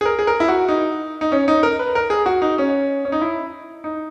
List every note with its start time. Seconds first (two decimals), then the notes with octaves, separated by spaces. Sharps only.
0.01 G#4
0.05 A#4
0.19 G#4
0.27 A#4
0.40 E4
0.48 F#4
0.68 D#4
1.21 D#4
1.32 C#4
1.48 D#4
1.63 A#4
1.79 B4
1.95 A#4
2.10 G#4
2.26 F#4
2.42 D#4
2.58 C#4
3.05 C#4
3.12 D#4
3.21 E4
3.84 D#4